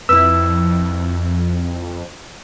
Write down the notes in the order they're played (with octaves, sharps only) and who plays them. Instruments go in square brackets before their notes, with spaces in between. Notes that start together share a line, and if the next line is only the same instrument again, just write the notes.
[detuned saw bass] F2 [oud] E4 B4 [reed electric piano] E6